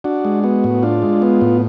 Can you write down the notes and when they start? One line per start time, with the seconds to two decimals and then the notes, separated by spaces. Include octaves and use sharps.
0.04 D4 F#4
0.25 G#3
0.44 B3 F#4
0.64 A2
0.83 D4 F4
1.02 G#3
1.22 B3
1.41 A2